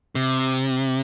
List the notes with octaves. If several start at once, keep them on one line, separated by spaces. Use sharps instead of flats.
C3